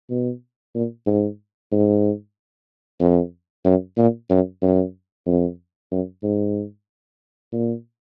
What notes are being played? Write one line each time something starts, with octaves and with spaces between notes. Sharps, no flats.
B2
A#2
G#2
G#2
F2
F#2
A#2
F#2
F#2
F2
F#2
G#2
A#2